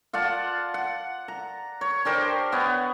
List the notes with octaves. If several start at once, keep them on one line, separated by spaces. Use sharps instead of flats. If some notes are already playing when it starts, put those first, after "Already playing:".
F4 D5 F#5 A5
F#5
A#5
C#5
D4 G4 A#4 C5
B3 C#5 F#5